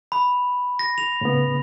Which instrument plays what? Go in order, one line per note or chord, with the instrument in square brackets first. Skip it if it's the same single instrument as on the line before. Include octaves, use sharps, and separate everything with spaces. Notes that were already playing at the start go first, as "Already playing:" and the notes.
[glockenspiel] B5
A#6
F7
[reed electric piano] A2 C#3 B3